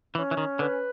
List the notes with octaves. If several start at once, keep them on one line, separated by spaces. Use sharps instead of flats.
E3 C#4
E3
D#3
D3 B4